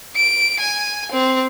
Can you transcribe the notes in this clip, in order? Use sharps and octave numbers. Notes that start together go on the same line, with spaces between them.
D7
G#5
C4